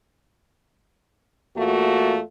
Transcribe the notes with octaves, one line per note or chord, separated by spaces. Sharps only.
E2 A3 A#3 F4 F#4